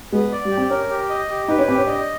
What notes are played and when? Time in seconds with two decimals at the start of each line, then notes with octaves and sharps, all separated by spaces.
0.12 G#3 B3
0.32 D5
0.45 G3
0.50 G4
0.57 C4
0.70 C#4 A#4
0.90 G4
1.10 D#5
1.30 G4
1.48 D#4 B4
1.58 C#4
1.68 C4 G4
1.78 C#4
1.87 D4 D#5